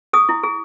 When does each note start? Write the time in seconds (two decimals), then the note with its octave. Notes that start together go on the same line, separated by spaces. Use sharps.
0.13 G#4 D#6
0.29 E4
0.43 G#4